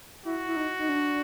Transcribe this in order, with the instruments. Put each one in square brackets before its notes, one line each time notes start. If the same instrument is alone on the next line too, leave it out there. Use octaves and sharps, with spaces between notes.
[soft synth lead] E4 [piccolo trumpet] F#4
[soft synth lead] E4
D#4
D#4
D4